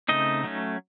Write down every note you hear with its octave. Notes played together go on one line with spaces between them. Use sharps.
C#3 A3 C4 D#4 D#5
F#3 A3 C#4